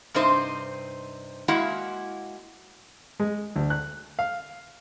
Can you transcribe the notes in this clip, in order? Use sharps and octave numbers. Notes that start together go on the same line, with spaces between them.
G2 C3 C4 D#4 C5
G#3 A#3 E4 F#4 F5 F#5
G#3
D2
F#6
F5